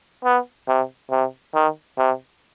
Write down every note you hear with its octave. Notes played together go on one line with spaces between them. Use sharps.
B3
C3
C3
D#3
C3